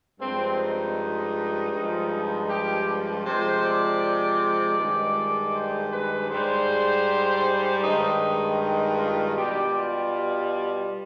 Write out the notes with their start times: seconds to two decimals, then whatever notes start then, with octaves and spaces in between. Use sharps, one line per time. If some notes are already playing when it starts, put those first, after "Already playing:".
0.20 G2 F3 G#3 C4
0.58 D#4
1.72 G2 F3 G#3
2.49 G4
3.25 C3 F3 G#3 C5
3.63 D5
4.78 G2 D#3 G#3
5.54 C5
5.92 B4
6.30 G#2 G3 C5
7.82 G2 D#3 G#3 D#4
8.59 D#4
8.97 F4
9.35 B2 G3 G4
9.73 F4